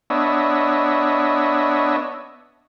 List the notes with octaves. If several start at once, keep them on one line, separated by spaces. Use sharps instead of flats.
B3 D4 C#5 D#5 E5